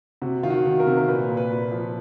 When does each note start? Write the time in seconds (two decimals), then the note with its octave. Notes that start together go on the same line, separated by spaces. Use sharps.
0.22 C3 F#4
0.43 D#3 F4
0.50 F#4
0.66 D#3
0.80 A#4
0.87 C3
0.97 A#4
1.08 A#2 B4
1.30 A#2
1.37 B4
1.51 A#2
1.72 F3